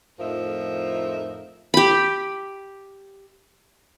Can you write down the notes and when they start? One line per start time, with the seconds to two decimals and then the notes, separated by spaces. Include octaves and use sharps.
0.19 F2 A2 F3 D#4 A#4 E5
1.74 G4 B5